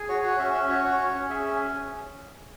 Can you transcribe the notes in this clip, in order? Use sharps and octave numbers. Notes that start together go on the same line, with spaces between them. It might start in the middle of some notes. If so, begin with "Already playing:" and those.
Already playing: G#4
F#4 C#5
F#4
C#4 E5
C#4
F#4 C#5
F#4
C#4
C#4
G#4 E5
C#4